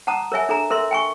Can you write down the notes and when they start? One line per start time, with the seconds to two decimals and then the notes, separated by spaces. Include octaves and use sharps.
0.07 F#5 A5 A#5 D#6
0.32 A#4 C#5 E5 G#5
0.49 D4 A4 G#5 A#5
0.70 A4 A#4 E5 C6
0.91 G5 G#5 C#6